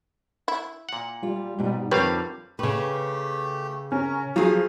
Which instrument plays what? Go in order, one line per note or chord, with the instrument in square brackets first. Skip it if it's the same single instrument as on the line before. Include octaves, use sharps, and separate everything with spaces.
[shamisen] E4
[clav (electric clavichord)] A#2 F#5
[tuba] G3 [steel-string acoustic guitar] F4
[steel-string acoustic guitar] G#2 B2 D#4 [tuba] G3
[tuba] F2 [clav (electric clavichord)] D3 G3 F5 [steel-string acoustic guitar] D#3 [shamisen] G4 B4 C#5
[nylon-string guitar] C#3 B4 [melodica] A3 G4
[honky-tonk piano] C#4 [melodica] A#4
[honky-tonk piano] F3 F#3 [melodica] A3 [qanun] G#4 F5